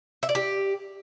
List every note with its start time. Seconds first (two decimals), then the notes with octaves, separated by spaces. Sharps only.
0.23 E5
0.29 D5
0.35 G4